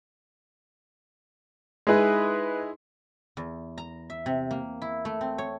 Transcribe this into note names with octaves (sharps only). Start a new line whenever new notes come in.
G#3 D#4 E4 G#4 B4
E2
A#5
E5
C3
A#3
E4
A3
C4
C#5